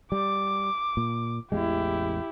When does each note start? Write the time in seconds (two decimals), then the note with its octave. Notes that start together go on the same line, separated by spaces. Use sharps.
0.12 G3 D6
0.97 A#2
1.52 A1 E2 G#3 E4 G4